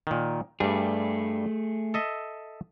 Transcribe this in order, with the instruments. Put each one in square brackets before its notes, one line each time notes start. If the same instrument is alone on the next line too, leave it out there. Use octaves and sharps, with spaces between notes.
[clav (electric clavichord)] A#2 D#3
[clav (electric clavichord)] G2 G3 [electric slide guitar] A3 G#4
[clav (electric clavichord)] A4 D#5 E5